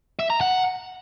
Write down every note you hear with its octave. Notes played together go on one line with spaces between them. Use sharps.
E5
A#5
F#5